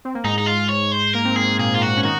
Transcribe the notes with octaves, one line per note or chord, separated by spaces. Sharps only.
C4
A#3
G#2 G#3 D#4
D#4
F4
C#5
C5
A#3 A#4
C4
A#3 G#4
C4
A#2 A#3 G#4
F4
F#4
C#4
D#3 D#4 F#4